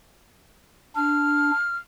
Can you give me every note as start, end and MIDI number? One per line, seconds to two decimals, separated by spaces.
0.96 1.51 62
0.96 1.77 89